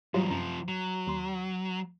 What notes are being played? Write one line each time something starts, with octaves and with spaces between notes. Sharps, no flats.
E2 G#2 F#3 G3 F4
F#2 C3 F3 A#5
F#3
D#2 C6